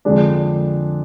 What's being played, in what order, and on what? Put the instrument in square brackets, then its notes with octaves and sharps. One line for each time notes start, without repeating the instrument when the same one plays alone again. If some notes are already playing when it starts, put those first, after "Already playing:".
[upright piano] F2 D3 G#3 D4